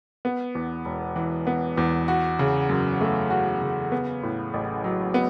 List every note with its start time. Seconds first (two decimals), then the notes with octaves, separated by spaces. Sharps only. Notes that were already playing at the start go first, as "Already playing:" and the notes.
0.25 B3
0.55 E2
0.85 E1
1.16 E3
1.47 B3
1.77 E2
2.08 F#4
2.39 C#3
2.69 F#2
3.01 A3
3.30 F#4
3.62 C#3
3.92 B3
4.23 A2
4.54 A1
4.84 F#3
5.14 B3